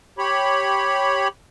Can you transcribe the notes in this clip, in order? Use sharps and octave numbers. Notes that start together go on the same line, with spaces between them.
G4 C#5 B5